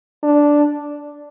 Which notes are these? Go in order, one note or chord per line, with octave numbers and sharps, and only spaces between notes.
D4